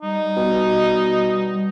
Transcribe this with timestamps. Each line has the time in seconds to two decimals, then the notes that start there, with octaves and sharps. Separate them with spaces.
0.02 G3 D#4
0.37 B2